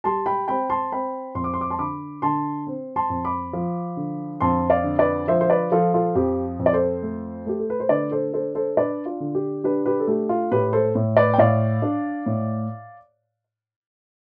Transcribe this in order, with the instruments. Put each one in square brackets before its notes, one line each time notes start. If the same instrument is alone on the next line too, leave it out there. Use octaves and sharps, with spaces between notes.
[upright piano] G3 A5 C6
G5 B5
C4 G5 B5
A5 C6
C4 G5 B5
F2 C6
D6
C6
D6
A5 C6
D3 B5 D6
D3 A5 C6
C4
A5 C6
F2
B5 D6
F3
D3
F2 A5 C6
D5 F5
D3
B4 D5
F3 C5 E5
C5
B4 D5
F3 F4 A4
F4 A4
F2 G4
F2
D5
A4 C5
A3
A3 G4
A4
B4
C5
D3 B4 D5
A4 C5
D4 A4 C5
A4 C5
D4 B4 D5
F4
D3
G4
D4 G4 B4
G4 B4
A4
A3 G4
F4
A2 G4 B4
A4 C5
A2
B4 D5
G5
A2 D5 F5
D4
A2